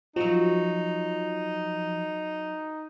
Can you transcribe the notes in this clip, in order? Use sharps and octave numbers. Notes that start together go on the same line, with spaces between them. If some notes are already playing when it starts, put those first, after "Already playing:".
F3 F#3 D#4 F#4